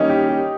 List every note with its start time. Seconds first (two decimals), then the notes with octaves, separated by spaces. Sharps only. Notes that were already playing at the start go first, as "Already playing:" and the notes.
Already playing: D#3 G3 A#3 C#4 D#4
0.09 G4
0.29 G4